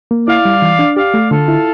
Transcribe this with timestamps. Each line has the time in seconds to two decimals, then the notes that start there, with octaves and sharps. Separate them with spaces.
0.11 A#3
0.28 E4 D5 F5
0.45 G3
0.62 E3
0.79 D4
0.96 G4 D5 F5
1.14 A3
1.31 D3 F4 A4
1.48 E4